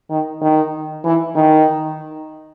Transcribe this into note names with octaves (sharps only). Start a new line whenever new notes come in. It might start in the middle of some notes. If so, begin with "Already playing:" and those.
D#3
D#3
E3
D#3